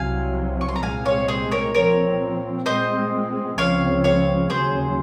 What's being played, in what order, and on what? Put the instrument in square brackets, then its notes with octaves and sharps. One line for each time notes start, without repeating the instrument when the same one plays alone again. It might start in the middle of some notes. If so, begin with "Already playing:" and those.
Already playing: [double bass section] C2 C3 F#3 [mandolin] F5 G#5
[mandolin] C#6
C6
A#5
[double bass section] C2 A#2 G#3 C4 [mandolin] F5 G#5
[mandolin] C#5 F5
G#4 C5
A#4 C#5
[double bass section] A#2 F3 C4 [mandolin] A#4 C#5
[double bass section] A#2 G#3 C4 [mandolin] C5 D#5
[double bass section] C#2 C#3 F3 C4 [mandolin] C#5 F5
[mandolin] C#5 F5
[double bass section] D#2 C#3 F#3 [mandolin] G#4 C5